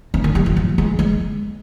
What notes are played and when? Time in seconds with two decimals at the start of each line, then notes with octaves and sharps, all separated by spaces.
0.14 C4
0.24 A#3
0.35 G3
0.46 F3
0.57 F3
0.78 G#3
0.99 G#3